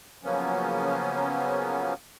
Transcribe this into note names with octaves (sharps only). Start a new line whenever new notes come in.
C#3 F3 F#3 A#3 B3 C#4